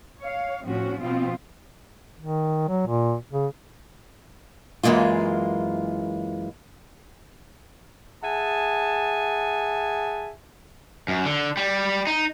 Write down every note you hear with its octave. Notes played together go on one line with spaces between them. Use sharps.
C#5 F5
A2 F3 C4 C#4 F#4
B2 F3 B3 C4 F4
D#3
F#3
A#2
C#3
F#2 E3 G#3 A#3 F4
G#4 E5 F#5 G#5 A5
F#2
D3
G3
D#4